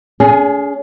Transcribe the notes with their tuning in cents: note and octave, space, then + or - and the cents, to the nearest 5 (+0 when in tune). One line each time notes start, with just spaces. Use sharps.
C#4 +45 G#4 +0